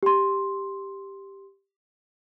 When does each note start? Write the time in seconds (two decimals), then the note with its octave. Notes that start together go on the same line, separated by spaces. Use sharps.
0.03 G4 C6